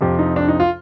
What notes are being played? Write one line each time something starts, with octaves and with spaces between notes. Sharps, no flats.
F2 C3 F3 G4
D#4
D4
D#4
F4